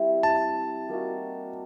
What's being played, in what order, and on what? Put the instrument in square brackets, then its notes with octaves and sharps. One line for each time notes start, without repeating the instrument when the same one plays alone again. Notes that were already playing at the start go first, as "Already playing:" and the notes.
Already playing: [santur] G3 C4 E4
[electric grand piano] A5
[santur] G3 A#3 D#4 F#4